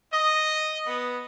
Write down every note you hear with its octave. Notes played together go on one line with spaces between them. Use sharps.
D#5
B3